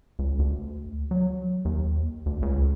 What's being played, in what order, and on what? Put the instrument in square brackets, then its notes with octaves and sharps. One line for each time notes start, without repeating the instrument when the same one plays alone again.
[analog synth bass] C#2
D2
F#3
D#2
D2
C#2